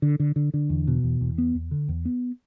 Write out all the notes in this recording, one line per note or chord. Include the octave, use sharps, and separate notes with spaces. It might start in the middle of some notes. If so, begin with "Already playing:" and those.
D3
D3
D3
D3
E2
B2
E2
E2
B3
E2
D3
E2
B3